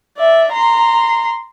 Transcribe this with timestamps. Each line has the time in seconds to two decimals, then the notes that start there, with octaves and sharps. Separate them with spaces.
0.18 D5 E5
0.52 A#5 C6